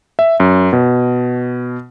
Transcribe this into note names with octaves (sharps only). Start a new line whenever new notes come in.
E5
F#2
B2